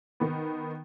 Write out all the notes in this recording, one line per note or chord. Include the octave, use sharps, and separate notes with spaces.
D#3 B3